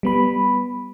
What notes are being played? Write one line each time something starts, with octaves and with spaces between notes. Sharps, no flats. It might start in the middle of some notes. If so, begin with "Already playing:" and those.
G3 B3 B5